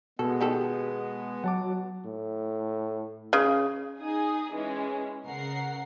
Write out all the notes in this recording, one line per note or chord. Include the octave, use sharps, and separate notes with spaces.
B2 G#3 B3 A4
D#3 G4 A4
F#3 F#5 A5 D6
A2
C#3
D#4 G#4 D#6
E3 G#3 C#4
C#3 A#4 F#5 C7